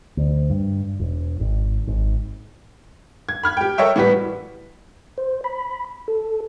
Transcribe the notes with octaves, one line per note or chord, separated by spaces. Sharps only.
D2
G2
E1
G#1
G#1
G#6
B5 F6 G#6
G4 G5
A4 A#4 C#5 D#5 E5 G5
A2 E3 G3 F#4 B4 B6
C5
B5
A4